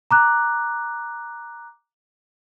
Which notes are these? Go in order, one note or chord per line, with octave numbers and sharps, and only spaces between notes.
A#5 D6 F#6